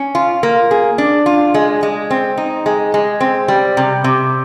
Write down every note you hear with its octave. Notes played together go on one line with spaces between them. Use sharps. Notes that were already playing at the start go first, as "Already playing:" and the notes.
Already playing: C#4
F4
A#3
G#4
D4
F4
G#3
G#3
C4
D#4
G#3
G#3
C4
G3
C3
C3